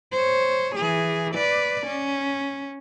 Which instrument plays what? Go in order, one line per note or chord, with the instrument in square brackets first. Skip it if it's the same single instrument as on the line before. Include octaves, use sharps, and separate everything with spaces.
[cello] C5 C#5
E3 G#4
B4 D5
C#4